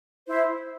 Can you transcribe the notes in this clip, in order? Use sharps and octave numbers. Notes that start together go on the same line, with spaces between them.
E4 C5 E5